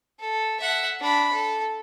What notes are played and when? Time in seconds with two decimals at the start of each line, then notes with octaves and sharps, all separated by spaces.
0.20 A4
0.60 E5 F#5
1.01 D4 B5
1.33 A4